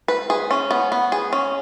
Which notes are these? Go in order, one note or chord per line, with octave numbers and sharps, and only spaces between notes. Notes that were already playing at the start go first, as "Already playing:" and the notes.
B4
G#4
C#4
B3
B3
G#4
C#4